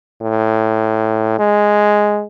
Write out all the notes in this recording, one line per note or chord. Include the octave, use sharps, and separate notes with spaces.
A2
G#3